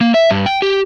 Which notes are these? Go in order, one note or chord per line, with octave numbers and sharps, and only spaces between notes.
A#3
E5
G2
G5
G4